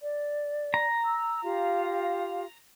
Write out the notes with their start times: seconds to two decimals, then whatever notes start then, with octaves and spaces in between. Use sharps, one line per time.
0.01 D5
0.74 A#5
1.03 E6
1.44 F4 G4 F5